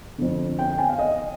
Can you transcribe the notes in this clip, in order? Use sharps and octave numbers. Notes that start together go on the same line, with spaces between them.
F2 D3
G5
G#5
F5
D#5